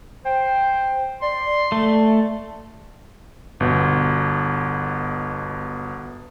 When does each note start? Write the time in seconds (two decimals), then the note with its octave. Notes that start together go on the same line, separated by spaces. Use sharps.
0.25 C5 G5
1.22 D5 C6
1.72 A3
3.60 G1 B2